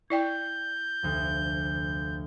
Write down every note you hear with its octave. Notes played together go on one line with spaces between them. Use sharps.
E4 D5 G5 G6
F1 D2